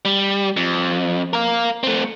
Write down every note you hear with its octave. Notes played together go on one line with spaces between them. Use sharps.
G3
F2
A#4 F5
A3 C4